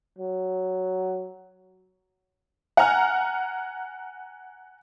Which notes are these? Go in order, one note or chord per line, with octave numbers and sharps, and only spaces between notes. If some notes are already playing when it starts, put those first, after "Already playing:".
F#3
F#5 G#5 A#5 F6